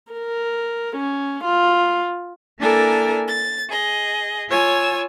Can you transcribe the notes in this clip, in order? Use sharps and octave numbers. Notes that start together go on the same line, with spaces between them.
A#4
C#4
F4
A#3 D4 E4 A4 A#4 G#5
A6
G#4 D#5
F4 C#5 G#5 E6